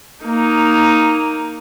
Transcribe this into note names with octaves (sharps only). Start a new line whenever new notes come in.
A#3 D#4